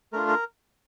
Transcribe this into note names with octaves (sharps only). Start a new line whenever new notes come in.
A3 D4 F4 A#4
A#4